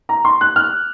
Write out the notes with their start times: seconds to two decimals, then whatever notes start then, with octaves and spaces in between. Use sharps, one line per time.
0.09 A#5
0.25 C6
0.41 F#6
0.56 F6